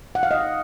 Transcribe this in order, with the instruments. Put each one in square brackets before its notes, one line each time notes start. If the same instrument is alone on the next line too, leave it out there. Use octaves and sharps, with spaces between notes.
[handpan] F#5
F5
D#5